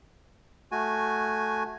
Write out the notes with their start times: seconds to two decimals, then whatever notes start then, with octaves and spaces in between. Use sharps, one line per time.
0.72 A3 F#4 G#5